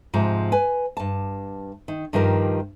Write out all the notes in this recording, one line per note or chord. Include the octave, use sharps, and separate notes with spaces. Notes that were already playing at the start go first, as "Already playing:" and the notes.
G#2 C3 F3
B4 G#5
G2 A5
D#3
G2 D#3 F3 G4 A#4